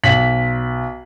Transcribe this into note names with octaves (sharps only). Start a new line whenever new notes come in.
B1 B6 F#7